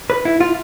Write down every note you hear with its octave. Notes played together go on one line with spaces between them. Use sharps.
B4
E4
F4